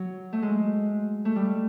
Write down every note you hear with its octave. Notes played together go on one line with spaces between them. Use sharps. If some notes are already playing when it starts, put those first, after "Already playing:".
Already playing: F#3
A3
G#3
A3
G3